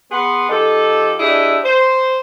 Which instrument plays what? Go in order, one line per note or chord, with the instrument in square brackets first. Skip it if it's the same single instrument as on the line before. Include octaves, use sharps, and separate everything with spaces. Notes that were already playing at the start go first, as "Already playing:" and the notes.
[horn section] B3 G#4 B4 F#5 C6
F3 D#4 G4 A4
D4 E4 G4 G#4 D#5 E5
C5